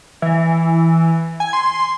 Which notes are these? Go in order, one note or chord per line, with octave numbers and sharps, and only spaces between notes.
E3
G#5
C6